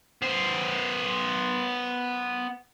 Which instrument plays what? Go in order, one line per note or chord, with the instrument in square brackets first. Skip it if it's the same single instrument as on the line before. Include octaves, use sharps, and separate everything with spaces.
[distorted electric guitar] B3 C5